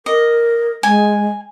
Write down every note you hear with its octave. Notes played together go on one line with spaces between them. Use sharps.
A#4 D#5
G#3 G#5